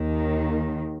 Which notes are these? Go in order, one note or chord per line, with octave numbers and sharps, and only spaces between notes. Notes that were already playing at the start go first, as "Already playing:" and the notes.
Already playing: D#2 D#3